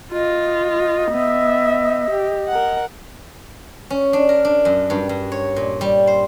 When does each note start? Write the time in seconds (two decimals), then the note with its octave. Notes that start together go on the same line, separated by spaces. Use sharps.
0.12 F4 D#5
1.11 B3 E5
2.11 G4
2.48 A#4 F#5
3.90 C#4
4.13 D4
4.29 A#4
4.45 D4
4.65 F#2
4.90 G2
5.09 G2
5.32 C#5
5.56 A#2
5.81 G3
6.07 C5